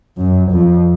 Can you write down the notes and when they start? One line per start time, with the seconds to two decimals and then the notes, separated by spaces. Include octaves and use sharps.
0.17 F#2
0.52 F2